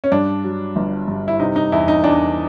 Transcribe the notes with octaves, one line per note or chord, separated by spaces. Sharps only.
C#4
G2 D4
F#3
G1
G2
E4
C3 D#4
D#4
E2 E4
D#4
E2 D4